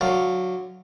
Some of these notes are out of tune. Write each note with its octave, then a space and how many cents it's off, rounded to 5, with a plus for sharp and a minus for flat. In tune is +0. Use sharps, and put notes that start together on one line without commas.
D3 +0 F#3 -10 F5 +0